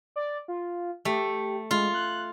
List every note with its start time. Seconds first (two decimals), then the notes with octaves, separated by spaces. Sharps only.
0.16 D5
0.48 F4
1.05 A3 G4
1.71 G#3 F4
1.94 F#6